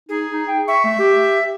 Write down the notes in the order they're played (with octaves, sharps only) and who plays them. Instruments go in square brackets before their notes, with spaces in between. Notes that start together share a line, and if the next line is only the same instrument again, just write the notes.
[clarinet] D#4 [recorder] G#4
[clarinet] D#4
G5
[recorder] E5 [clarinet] C#6
[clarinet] A3
G4